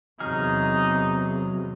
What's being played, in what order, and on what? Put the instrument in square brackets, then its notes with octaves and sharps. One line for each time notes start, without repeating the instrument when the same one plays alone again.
[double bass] E2 C3 [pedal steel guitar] F#3 G#4 F6 [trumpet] D#4